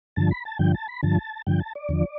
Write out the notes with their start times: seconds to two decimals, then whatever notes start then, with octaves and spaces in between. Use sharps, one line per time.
0.16 G2 D3 F3 A5
0.31 B5
0.45 A5
0.59 G2 D3 F3 G5
0.74 A5
0.88 B5
1.03 G2 D3 F3 A5
1.47 G2 D3 F3 G5
1.60 A5
1.75 D5
1.89 E2 D3 F3